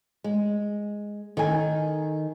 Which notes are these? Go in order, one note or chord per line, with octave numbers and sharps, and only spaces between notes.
G#3
D#3 A4 G#5